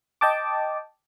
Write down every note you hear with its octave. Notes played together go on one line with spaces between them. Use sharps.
D#5 G5 A5 D6